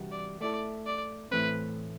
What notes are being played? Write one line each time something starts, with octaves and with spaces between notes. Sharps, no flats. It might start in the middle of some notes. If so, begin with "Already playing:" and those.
Already playing: C3 E3 G3 D4 F#4
D5
A3 E4 A4 D5
D5
A2 E3 A3 C4 B4